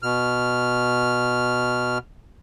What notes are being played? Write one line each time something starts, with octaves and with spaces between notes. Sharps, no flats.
B2 F6